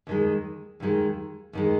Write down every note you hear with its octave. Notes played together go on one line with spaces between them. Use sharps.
D#2 D#3 G#3
D#2 D#3 G#3
D#2 D#3 G#3